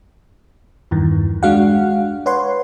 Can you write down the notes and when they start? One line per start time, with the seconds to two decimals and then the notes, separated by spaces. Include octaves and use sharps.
0.91 E2 G2 D#3 E3
1.43 G#3 D4 F#4 F5 F#5
2.26 B4 C#5 F#5 C6